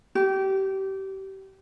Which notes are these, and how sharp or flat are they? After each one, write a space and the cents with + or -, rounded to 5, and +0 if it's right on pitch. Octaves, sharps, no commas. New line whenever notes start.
G4 -25